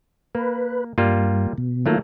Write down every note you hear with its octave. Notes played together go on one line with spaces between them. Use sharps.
A#3 B4
G2 G3 A#3 F4
B2
D#3 F#3 A3 A#3 F4